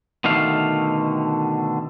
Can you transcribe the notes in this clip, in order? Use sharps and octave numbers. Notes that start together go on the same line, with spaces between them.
B2 D3 D#3 A3 F5